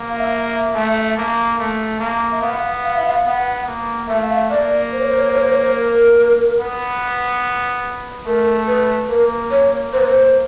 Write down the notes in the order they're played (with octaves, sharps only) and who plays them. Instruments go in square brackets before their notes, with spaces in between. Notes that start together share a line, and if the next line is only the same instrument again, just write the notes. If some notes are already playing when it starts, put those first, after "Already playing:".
Already playing: [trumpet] A#3
[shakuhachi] F5
E5
E5
[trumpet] A3
A#3
A3
A#3
[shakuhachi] E5
[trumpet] B3 [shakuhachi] F5
[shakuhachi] F5
E5
F5
[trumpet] B3 [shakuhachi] F#5
[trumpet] A#3
[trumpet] A3 [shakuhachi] E5
[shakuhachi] F5
E5
[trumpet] A#3 [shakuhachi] D5
[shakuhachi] C5
C#5
C5
C#5
C5
C#5
C5
C#5
C5
A#4
[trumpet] B3
[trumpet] A3 [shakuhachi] A#4
[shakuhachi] B4
[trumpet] A#3 [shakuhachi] A#4
[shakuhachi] C#5
[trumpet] A#3 [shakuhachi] C5
[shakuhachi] B4
C5